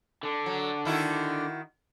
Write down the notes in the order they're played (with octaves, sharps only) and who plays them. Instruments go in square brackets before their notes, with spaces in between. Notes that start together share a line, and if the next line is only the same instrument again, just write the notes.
[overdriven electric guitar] D3 D4
[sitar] F#3
D#3 E4 F#4